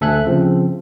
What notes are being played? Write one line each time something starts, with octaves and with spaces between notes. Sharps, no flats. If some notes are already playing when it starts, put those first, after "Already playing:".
D2 A4 E5 G#5 F#6
C#3 F3 C4